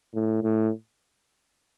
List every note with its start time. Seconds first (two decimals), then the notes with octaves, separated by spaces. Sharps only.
0.14 A2
0.43 A2